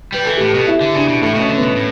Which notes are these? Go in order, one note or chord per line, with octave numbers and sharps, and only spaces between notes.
G3 B4
E3 A4
A2 G4
A4
B2
E4
D3
C#3 D4
B2
A2 A3
B2
C#4
D3
B2 B3
A2